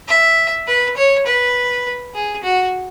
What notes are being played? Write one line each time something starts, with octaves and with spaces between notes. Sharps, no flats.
E5
B4
C#5
B4
G#4
F#4